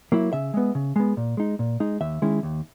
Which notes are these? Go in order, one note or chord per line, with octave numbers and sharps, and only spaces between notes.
F#3 A#3 E4
C#3 E5
G#3 B3
C#3
G#3 B3
A#2
G#3 D#4
A#2
G#3 D#4
D#2 E5
D#3 G#3 C#4 E4
D#2